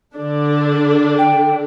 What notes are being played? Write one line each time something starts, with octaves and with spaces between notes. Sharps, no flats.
D3 D4
G5